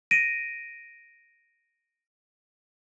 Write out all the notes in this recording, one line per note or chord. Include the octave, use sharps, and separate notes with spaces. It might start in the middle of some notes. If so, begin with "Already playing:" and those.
A#6 D7 D#7